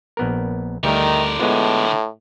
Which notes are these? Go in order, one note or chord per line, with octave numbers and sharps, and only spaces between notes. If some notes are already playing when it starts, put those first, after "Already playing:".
A#1 B3 A#4
D2 D3 D#3 G3 A3 A#4
A2 G#3 B3 F4